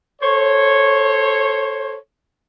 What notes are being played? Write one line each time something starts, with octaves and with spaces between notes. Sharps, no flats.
A4 C5 C#5